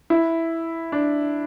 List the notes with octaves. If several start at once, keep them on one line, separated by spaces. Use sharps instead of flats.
E4
D4